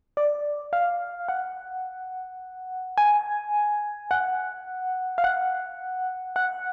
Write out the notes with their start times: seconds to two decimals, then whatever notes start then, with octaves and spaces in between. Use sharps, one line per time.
0.17 D5
0.73 F5
1.29 F#5
2.98 G#5
4.11 F#5
5.18 F5
5.24 F#5
6.36 F#5